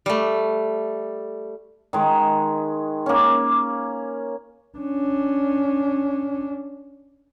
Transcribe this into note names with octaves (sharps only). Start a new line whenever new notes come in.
G3 A3
D#3 G#3
A#3 C#4
C#4 D4